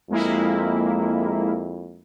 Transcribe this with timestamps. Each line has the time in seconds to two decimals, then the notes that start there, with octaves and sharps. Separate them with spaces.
0.10 F2 G#3 A#3 E4